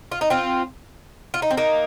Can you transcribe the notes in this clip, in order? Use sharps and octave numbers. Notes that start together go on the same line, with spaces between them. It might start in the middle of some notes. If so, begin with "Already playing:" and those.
F4
D#4
C4 F4
F4
D#4
C4
A#3 D#4